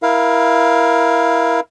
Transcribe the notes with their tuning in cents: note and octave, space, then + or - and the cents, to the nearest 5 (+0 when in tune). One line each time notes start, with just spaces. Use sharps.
E4 +0 A#4 +20 F5 +0